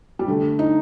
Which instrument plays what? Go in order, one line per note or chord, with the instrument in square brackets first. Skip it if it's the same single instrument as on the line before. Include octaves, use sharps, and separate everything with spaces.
[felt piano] G3
D3 A3
D#4